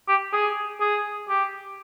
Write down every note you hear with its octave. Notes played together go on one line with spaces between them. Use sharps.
G4
G#4
G#4
G4